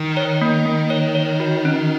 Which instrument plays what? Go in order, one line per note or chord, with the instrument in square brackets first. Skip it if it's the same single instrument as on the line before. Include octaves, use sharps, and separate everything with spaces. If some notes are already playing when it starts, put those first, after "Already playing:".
Already playing: [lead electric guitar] D#3
[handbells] C#5
A#3
A#3
C#5
C#5
F#4
C#4